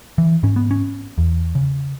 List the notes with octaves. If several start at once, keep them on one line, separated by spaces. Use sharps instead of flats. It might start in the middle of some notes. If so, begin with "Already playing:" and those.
E3
G#2 C#4
B3
C#4
E2
C#3